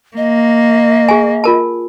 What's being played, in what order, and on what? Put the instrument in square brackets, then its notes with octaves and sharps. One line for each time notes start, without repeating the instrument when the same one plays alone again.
[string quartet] A#3 [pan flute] D#5
[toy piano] G#4 G#5
F4 A#4 A5